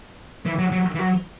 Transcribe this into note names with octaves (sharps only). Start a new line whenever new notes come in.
E3
F#3
F#3
E3
F#3